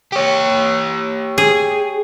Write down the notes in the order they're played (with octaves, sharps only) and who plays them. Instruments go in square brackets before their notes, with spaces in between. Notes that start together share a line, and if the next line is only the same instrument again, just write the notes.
[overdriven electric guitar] G4 C#5
[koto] G#4